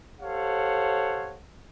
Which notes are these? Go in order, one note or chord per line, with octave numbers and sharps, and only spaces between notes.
G4 A4 C5 C#5 F5 F#5